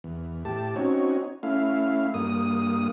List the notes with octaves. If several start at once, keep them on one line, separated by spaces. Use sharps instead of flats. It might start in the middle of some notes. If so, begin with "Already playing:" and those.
E2
A2 G4 A5
C4 C#4 D#4 F#4 C#5
A3 C#4 E4 F5
G2 A#3 D#6